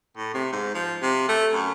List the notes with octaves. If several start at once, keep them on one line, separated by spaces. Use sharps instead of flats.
A2
C3
G#2
F3
C3
A3
F#2